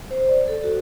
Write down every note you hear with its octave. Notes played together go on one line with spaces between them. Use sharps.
C5
D5
A4
F#4